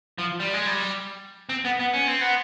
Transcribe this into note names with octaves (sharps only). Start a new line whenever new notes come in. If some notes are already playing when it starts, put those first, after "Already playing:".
F3
G3
G#3
G3
C4
B3
B3
C#4
C4
B3